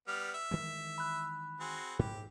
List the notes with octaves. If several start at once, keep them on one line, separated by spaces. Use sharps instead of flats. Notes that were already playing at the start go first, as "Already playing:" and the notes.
G3 B3 F6
E5
D#3 E3 G#3
B5 F#6
C4 F#4 G#4
G#2 G4